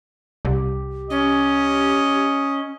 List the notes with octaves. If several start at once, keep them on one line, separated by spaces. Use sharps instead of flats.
C2 G4
C#4 D#5